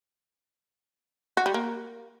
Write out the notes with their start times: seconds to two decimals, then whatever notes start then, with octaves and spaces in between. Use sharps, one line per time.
1.37 F#4
1.46 G3
1.54 A#3